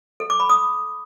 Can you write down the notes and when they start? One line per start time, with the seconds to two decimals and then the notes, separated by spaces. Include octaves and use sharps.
0.20 A4
0.30 D6
0.40 B5
0.49 D#6